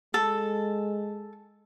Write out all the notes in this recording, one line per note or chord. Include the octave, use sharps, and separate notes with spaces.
G#3 A4